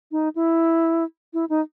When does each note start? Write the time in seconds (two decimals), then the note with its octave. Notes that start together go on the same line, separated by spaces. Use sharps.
0.12 D#4
0.35 E4
1.33 E4
1.49 D#4